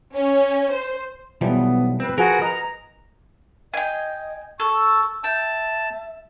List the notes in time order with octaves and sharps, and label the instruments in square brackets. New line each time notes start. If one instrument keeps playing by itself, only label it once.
[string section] C#4
C5
[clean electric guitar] B1 [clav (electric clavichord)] E3 F3 G3 [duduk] B3
[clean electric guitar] C4 [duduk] B4
[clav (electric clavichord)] F3 [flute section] F#4 G#4 [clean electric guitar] A#4
[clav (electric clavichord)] D#5 [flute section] A#5
[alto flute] D#5 [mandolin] G5 G#5
[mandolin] A4 [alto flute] C#6
[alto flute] E5 [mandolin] G5 [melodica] A5